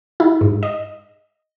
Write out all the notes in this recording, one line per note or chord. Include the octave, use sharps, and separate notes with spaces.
E4
G#2
D#5